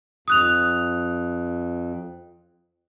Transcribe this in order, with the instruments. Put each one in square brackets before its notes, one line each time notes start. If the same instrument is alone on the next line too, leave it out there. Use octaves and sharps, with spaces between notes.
[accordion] F2 [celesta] D#6 F#6 F7